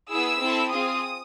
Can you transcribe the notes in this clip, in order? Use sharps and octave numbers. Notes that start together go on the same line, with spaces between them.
B3 E4 G#4 E6
C4 E4 A4
C4 F4 G#4 D#6